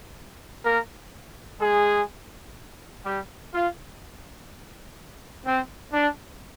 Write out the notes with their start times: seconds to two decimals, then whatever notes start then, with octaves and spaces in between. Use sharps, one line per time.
0.65 A#3 A#4
1.61 G#3 G#4
3.05 G3 G4
3.53 F4
5.45 C4
5.94 D4